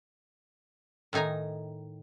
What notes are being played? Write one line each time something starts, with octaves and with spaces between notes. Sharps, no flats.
A2 D#3 D#4 G#5 A#5